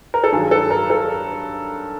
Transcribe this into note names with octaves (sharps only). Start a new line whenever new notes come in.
A#4
A4
G2 D#3 F#3 G#4
A4
A#4
A4